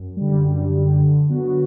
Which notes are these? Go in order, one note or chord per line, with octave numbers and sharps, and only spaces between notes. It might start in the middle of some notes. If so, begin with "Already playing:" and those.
Already playing: F#2
D3 G3
F#2
D3 G3
D3
F#3 B3 F#4